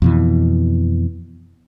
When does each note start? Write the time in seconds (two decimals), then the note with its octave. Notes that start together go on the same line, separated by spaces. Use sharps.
0.02 F2 B2 E3